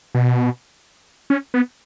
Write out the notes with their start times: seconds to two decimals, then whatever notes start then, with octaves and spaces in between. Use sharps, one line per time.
0.15 B2
1.30 C#4
1.54 B3